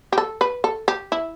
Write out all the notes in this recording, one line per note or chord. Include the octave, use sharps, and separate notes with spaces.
G4
A4
B4
A4
G4
E4